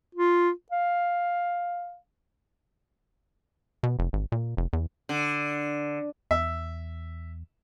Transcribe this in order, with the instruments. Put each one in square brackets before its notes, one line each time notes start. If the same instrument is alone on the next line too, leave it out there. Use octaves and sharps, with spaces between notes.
[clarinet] F4
F5
[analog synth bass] B2
F1
G#1
A#2
F1
E2
[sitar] D3
[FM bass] E2 [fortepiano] E5